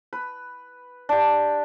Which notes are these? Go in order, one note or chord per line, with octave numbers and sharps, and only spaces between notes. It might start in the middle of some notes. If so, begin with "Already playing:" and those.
B4
D4 G4